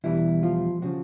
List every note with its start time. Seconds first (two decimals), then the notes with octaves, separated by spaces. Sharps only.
0.04 E2 B2 E3 G3 E4
0.43 F3 F4
0.82 C#3 F3 F#3 F#4